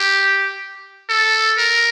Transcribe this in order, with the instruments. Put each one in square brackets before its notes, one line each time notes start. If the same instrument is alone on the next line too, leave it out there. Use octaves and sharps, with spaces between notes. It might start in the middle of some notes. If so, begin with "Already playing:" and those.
Already playing: [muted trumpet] G4
A4
A#4